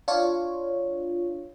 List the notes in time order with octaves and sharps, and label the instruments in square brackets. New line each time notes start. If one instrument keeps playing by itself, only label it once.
[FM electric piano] D4 F4 C#5